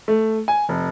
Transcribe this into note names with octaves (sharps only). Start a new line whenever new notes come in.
A3
G#5
F1